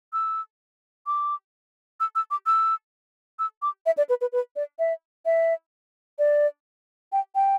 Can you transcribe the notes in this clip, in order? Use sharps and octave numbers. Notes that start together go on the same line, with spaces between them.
E6
D6
E6
E6
D6
E6
E6
D6
E5
D5
B4
B4
B4
D5
E5
E5
D5
G5
G5